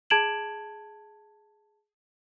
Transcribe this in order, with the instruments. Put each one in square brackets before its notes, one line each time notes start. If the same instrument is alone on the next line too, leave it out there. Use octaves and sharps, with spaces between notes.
[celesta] G#4 A5 G#6 D7 E7 F#7